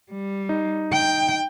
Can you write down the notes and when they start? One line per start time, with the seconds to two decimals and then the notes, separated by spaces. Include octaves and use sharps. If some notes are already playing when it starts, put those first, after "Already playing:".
0.11 G3
0.49 D#4
0.93 G5